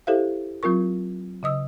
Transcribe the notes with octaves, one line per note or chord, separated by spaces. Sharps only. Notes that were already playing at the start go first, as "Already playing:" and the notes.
E4 G4 A4 C5 E5 F5
F#3 C4 F4 A#4 C#6
C#3 D#5 D#6 E6